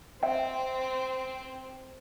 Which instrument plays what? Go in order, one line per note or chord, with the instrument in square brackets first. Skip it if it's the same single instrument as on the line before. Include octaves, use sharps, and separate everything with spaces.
[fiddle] C4 [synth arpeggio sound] E5 G5